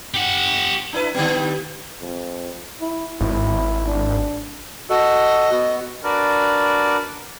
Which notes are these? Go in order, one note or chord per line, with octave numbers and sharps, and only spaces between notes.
G4 F#5
D4 E4 B4
D3 G3 B3
F2
E4
G#1 E4
D4
F#4 A4 D#5
B3 F#4
D4 F#4 A#4 B4 D5